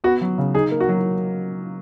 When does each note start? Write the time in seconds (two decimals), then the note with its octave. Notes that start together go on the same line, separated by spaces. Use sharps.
0.04 B3 F#4
0.21 F#3
0.38 C#3
0.55 D#4 G#4
0.71 A#3
0.80 F#4
0.88 F#3